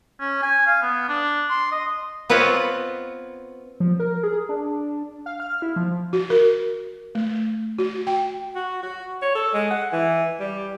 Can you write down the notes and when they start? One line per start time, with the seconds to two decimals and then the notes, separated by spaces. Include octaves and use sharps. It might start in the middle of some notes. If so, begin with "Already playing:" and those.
0.20 C#4
0.43 G#5
0.67 F5
0.82 B3
1.09 D4
1.50 C6
1.72 D#5
2.30 B3 C4 F4 B4 C#5 D#5
3.80 F3
4.00 A#4
4.23 G#4
4.49 D4
5.26 F5
5.40 F6
5.62 E4
5.76 F3
6.13 F#4
6.30 A#4
7.15 A3
7.79 F#4
8.07 G5
8.55 F#4
8.83 F#4
9.22 C#5
9.35 A4
9.53 G#3
9.70 F#5
9.92 E3
10.40 G3